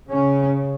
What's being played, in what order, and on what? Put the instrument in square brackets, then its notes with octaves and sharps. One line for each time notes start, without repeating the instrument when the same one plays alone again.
[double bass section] C#3 C#4